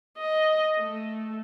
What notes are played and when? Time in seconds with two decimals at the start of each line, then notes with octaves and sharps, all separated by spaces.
0.18 D#5
0.78 A3